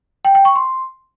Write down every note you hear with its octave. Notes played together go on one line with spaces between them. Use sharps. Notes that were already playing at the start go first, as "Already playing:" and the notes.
G5
G5
C#6
C6